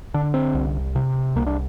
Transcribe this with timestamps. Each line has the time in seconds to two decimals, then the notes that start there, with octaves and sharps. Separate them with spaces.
0.14 D3 D4
0.34 C4
0.54 C2
0.95 C3
1.36 C2 A#3
1.46 D4